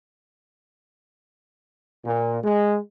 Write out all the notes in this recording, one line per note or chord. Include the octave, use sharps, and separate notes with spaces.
A#2
G#3